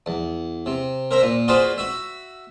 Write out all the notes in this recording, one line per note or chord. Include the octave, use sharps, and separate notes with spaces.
E2
C3
A#4 C5 E5 A#5
A#2
F4 F#4 G#4 B4 C5 D5
F#4 E5